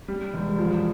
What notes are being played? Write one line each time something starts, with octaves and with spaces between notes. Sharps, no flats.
G3
E1
F3